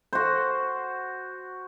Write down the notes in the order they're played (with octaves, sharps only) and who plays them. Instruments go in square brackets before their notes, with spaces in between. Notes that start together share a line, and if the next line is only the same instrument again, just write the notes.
[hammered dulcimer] F#4 C5